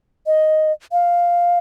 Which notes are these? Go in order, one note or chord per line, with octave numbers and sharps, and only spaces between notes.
D#5
F5